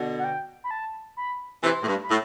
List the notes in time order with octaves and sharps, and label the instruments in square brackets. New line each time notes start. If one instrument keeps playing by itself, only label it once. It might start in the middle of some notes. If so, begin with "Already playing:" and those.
Already playing: [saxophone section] B2 D3
[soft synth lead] F#5
G5
B5
A5
B5
[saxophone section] C3 E3 [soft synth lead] C6
[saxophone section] A2
G2
[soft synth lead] B5
[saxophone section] A2